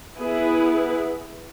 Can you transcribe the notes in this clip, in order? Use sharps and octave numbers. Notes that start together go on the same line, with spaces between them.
B3 E4 G#4 B4